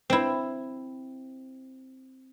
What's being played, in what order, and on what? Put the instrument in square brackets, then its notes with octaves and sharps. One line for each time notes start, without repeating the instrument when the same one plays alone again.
[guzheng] C4 E4